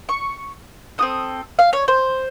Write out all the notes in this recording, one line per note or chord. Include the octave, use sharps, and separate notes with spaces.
C#6
C4 F#4 A4 D#6
F5
C#5
C5